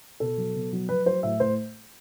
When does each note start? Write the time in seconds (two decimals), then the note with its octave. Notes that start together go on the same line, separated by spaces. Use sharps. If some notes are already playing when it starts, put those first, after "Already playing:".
0.20 B2 A4
0.38 F#3
0.55 B2
0.73 F#3
0.89 F#3 B4
1.06 F#3 C5
1.23 A2 E5
1.40 A2 C5